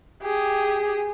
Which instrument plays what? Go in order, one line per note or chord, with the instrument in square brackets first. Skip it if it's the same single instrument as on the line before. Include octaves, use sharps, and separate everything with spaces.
[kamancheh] G4 G#4